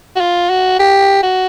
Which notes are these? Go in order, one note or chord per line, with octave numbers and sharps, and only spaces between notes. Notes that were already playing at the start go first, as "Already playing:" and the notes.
F#4
F4
F#4
G4
F#4